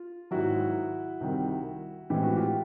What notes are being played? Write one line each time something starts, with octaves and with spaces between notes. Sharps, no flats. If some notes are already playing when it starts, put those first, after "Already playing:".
Already playing: F4
G#2 D#3 F#3 E4 F#4
C2 C3 D#3 G3
A2 E3 G#3 C4 G4
F#4
F4 G4